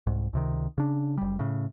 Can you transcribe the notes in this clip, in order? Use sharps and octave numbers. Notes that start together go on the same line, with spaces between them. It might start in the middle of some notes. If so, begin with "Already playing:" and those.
C2 G#2
C#2 C3 D#3
C#3 D4
F#1 G3
A2 C#3